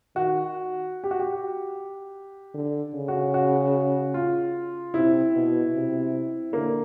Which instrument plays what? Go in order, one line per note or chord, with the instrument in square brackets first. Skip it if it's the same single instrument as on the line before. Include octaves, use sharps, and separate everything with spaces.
[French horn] D#3 [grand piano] F#4
[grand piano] G4
F#4
G4
[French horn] D3
C#3
[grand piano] F#4
F#4
F4
[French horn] C3 [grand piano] E4
[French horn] B2
C3
[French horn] D3 [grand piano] A#3